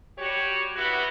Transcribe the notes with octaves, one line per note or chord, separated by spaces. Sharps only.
G3 F#4 G4 C#5
B3 E4 F#4 G4